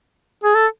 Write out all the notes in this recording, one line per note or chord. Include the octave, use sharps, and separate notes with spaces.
G#4
A4